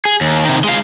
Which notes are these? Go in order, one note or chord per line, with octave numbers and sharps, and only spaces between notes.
G#4
D#2
C3 D#3
G#3 F5